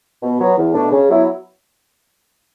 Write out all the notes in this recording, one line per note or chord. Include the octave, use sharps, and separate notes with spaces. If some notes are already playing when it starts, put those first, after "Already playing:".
B2
F#3 B3
E2
B2 A3 D4
C#3
F#3 B3 E4